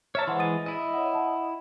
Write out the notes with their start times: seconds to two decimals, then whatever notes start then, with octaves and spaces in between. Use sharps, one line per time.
0.15 C#5 E5 A5 A#5 E6 F6
0.27 E3 G#3 C5 F#5 C6
0.39 D#6 A6 D#7
0.66 E4 D#5
0.94 C#5 F#5
1.13 F#5 A5